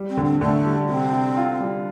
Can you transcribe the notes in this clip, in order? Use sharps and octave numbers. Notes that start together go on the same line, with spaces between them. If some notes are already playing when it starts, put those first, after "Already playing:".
Already playing: G3
C4
D3
C4
D3 A3
G3
C3 C4
C3
F4
G3